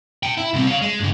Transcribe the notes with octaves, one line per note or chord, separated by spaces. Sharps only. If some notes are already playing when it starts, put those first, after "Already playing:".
E5 G5
E4
C2 C4
C#4 F5
G#3
G2 C#3